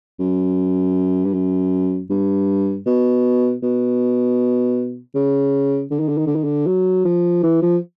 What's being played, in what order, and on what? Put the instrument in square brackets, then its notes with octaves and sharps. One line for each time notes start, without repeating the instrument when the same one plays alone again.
[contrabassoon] F#2
G2
F#2
G2
B2
B2
C#3
D3
D#3
D3
D#3
D3
D#3
D3
F#3
F3
E3
F3